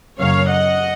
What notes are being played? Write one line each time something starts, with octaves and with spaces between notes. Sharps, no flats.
F#2 C#3 F#3 A#3 C#4 C#5 F5
D#5 F#5